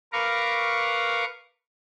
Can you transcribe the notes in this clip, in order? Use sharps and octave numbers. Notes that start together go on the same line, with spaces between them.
A#4 B4 F5 A#5 C#6 D6